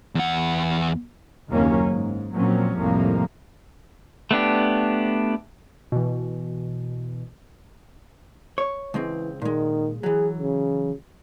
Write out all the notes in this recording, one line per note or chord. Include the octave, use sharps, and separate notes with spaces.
E2 F#5
F#1 D#2 D#3 F#3 A#3 C#4
G#2
A#2 F3 F#3 A#3 C4 C#4
C2 F2 A2 F3 A#3
A3 B3 D4 G4
B2 E3
C#5
C#2 E3 G#3 C4
A#2 D#3 G#3
E3 F#3 G#4
C#3